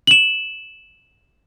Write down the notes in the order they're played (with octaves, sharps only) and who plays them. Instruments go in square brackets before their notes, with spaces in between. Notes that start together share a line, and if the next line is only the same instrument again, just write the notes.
[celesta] E7 F#7